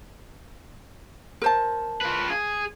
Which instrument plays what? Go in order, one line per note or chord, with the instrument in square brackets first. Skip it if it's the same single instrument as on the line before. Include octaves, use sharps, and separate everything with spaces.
[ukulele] A#4 C5 A5
[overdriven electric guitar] F4 B4
G#4